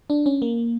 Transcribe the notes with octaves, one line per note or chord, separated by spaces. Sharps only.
D4
C#4
A#3